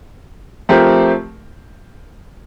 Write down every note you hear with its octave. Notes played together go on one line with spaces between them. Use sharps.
F3 A3 C4 G4 A#4